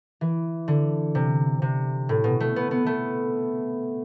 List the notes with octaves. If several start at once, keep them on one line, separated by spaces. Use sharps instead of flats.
E3
D3
C3
C3
A2
B2
A3
B3
B3
A3